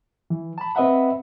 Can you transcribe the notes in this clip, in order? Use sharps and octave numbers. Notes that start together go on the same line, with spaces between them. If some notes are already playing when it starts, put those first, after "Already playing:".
E3
A5 B5
C4 B4 D#5 E5 F#5 B5